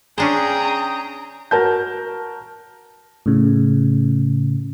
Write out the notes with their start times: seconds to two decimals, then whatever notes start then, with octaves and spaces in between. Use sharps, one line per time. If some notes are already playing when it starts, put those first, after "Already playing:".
0.18 C#4 D4 G#4 C5 G5 A#5 D#6
1.51 F#4 A#4 A5 G6
3.26 A2 C#3